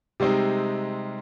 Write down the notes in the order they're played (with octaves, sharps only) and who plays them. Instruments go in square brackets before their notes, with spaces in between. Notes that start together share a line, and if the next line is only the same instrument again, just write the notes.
[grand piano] C3 G3 G#3 C4 D#4